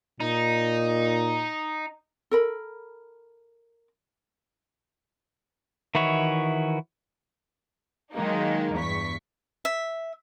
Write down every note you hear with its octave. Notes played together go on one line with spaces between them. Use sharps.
A#2 D#4
A4 A#4 B5
D#3 E3 E4 F#4 C#5
D#3 F#3 G#3 A#3 D#4
E2 G2 C#6 B6
E5